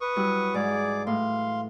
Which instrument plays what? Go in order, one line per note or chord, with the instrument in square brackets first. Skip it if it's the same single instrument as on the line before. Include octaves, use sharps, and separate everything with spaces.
[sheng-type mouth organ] B4 C#6 D#6
[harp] F#3 G3 E4
[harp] G#2 E3 [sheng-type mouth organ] G#4 D5 D6
[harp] A2 [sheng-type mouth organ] F5 C6